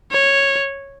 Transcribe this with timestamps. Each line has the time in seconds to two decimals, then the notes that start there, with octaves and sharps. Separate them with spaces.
0.11 C#5